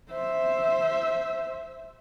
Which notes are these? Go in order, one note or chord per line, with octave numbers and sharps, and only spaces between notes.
C5 E5